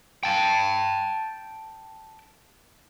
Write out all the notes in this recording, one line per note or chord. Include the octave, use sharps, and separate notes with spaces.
G5 A5